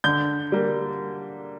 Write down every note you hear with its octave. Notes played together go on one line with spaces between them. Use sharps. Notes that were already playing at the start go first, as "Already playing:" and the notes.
D3 G6
G3 A#3